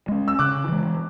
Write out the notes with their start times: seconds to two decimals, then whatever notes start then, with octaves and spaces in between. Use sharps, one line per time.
0.08 G#3 C#4
0.28 E6
0.39 C#3 D6 F#6
0.69 E3 G#3